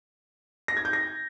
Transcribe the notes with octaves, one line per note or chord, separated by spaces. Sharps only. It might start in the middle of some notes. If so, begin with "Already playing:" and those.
A#6
G#6
G6
A#6